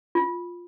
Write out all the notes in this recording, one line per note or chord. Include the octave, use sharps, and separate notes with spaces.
F4